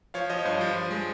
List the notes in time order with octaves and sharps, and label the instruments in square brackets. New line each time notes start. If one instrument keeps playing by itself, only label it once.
[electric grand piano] F3 C#5 F5
F3 C5 D#5
C#5
G2 C5
F3
F3
G#3